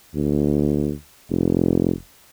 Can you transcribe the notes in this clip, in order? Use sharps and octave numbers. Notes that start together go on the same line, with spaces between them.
D2
F1